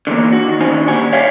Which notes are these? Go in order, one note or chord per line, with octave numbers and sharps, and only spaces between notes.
D3 E3 F3 A#3
F#4
D#3
D#2 D#3 C#4 D4 C5 G#5
A#2 G3 F#5 G#5
C#5 D5 E5 F5 G5 G#5